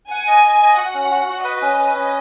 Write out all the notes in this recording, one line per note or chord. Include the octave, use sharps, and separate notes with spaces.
F#5 G#5
D#5
D#5
D#5
F#4 F#5
C#4
F#4
F#4
B4 D#5
C#4
B4
C#4